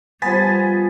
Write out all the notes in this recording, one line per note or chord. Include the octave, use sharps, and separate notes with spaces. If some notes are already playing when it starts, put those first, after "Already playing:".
F3 G3 B3 G#5 A6 B6